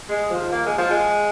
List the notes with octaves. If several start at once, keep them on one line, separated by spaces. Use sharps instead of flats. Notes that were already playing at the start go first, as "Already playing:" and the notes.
G#3
D#2 D#3 F3
A#3
G#3
F3
G#3